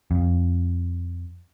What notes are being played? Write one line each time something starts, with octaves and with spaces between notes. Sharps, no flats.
F2